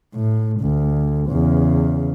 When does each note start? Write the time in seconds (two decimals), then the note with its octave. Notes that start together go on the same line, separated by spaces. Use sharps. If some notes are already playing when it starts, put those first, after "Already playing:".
0.15 A2
0.60 D2
1.28 E2 C#3